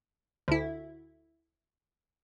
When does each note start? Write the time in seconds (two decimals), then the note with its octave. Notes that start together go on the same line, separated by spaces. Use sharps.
0.48 D2 E4